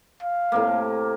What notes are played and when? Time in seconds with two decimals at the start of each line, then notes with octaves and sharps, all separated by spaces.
0.22 F5
0.52 A2 C3 A#3